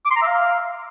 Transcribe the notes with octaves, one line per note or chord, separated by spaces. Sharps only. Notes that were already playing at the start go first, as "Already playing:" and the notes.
D6
C6
A#5
E5
F5